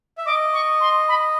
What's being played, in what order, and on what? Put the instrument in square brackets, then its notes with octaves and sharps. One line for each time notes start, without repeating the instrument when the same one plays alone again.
[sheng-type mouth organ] E5
[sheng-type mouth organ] D#5 [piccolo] D6
[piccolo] C#6
C6
B5